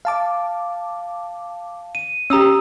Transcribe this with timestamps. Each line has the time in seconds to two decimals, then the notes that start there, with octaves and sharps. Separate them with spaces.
0.05 F5 A5 D6
1.95 D#7
2.30 C#4 G4 A#5 D#6 E6